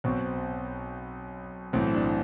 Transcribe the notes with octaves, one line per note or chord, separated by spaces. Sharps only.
B1 B2 C4
B1 A2 E3 C4
D4